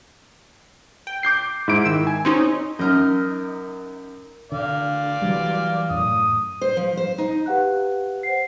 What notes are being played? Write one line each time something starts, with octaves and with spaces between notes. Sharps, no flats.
G5
D6 G6 C7
G#2 E4 D7
D#3 E6
G#5
C4 C#4 D#4
F#2 D#4 A#4 D#5
D3 D5 F5
E3 F#3 G3
F#2 A2 D#6
C5
F3
C5
D#4
G4 B4 F5 F#5 G#5 F#6
C5 F#5 C7